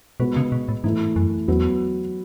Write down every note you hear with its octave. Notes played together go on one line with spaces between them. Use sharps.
B2 G#3 B3 F#4 B4
C#3
B2
A2
G#2 E3 A3 E4
F#2
E2 F#3 B3 F#4 B4